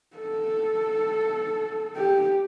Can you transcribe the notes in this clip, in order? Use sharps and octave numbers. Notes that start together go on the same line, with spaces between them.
A4
G4